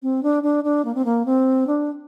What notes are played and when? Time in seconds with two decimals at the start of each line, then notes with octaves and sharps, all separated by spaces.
0.03 C4
0.23 D4
0.43 D4
0.64 D4
0.85 A#3
0.95 C4
1.05 A#3
1.26 C4
1.67 D4